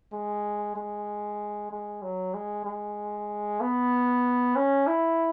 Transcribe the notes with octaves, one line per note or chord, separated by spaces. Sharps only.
G#3
G#3
G#3
F#3
G#3
G#3
B3
C#4
E4